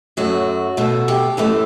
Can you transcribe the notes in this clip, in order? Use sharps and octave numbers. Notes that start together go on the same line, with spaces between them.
F#2 F#3 A3 F#4
B2 A3
G4
F#2 E3 A3